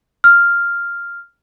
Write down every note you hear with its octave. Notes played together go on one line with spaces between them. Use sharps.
F6